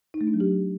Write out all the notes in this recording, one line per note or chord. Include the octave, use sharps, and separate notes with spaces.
D#4
A3
D4
F#3
G4